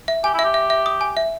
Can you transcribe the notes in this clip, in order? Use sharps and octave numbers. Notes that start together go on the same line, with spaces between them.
E5
G4 G#5
E4 E5
G4
E5
E5
D#6
G#5
E5